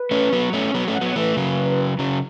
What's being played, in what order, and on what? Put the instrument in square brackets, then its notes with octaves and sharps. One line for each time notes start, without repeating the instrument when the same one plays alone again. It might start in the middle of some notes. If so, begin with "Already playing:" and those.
Already playing: [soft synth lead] B4
[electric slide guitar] A3 C#4
F#3 B3
A3 C#4
[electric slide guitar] F#3 B3 [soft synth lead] C#5
[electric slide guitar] A3 C#4
[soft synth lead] F#5
[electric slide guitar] F#3 B3 [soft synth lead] C#5
[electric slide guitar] E3 A3 [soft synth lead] B4
[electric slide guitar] C#3 F#3
C#3 F#3